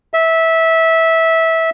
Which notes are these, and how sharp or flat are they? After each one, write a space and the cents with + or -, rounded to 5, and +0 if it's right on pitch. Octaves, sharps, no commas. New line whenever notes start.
E5 -15